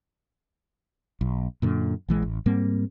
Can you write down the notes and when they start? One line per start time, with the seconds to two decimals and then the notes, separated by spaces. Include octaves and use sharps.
1.21 B1
1.62 F#2 A#2 D3
2.08 A#1 E3 G#3
2.22 A1
2.46 G#2 G3 A#3 C4